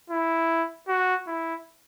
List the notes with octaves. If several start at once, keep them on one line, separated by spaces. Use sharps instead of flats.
E4
F#4
E4